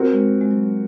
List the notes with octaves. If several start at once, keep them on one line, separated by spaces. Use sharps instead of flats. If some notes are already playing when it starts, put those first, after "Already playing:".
Already playing: C4 F#4 A#4
G#3
G#3
F#3